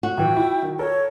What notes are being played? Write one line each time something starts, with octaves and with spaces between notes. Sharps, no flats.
F#4
A2 E3 G5
E4
D#3
A4 A#4 C#5